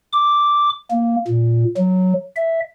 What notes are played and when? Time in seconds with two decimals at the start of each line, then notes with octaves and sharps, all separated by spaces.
0.13 D6
0.91 A#3
1.28 A#2
1.77 F#3
2.36 E5